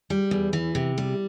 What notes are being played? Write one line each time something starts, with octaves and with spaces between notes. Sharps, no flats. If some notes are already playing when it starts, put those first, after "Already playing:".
G3
E2
E3
C3
G3